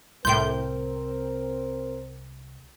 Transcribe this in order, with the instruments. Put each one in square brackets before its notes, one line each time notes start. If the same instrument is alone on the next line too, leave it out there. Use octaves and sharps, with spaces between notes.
[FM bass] C2 [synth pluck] A2 G6 [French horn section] C4 A#4 [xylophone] G5 C6